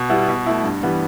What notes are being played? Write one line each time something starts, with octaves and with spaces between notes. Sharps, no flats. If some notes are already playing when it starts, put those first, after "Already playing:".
Already playing: B2
G3 B3 E4
B2
A3 E4
G2
E3 G3 B3